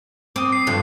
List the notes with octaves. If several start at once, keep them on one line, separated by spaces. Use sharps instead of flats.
C4 D6 D#6
C7
G2 D3 F3 F4 F#4